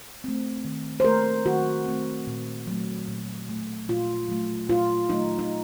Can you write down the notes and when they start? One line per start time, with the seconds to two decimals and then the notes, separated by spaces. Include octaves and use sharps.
0.24 A3 C4
0.65 D#3
1.00 C5
1.04 A3 C4 A#4
1.46 D#3 F#4
1.86 A3 C4
2.27 A#2
2.67 F#3 A3
3.08 A#2
3.48 F#3 A3
3.89 A#2 F4
4.29 F#3 A3
4.69 A#2 F4
5.09 F#3 A3 D#4
5.39 D#4